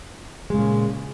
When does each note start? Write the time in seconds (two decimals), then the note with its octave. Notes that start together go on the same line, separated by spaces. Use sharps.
0.50 G#3
0.54 C#3
0.58 A#2